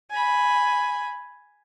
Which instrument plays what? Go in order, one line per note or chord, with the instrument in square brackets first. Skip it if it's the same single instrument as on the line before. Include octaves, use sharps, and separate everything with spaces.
[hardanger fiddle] G#5 B5